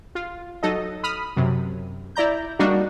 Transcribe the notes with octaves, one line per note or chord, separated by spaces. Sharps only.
F4
F#3 D#4 A4 D#5
B5 D#6 F6
F#2 C3
E4 D5 A#5 G6
G3 A#3 D4 D#4 F#4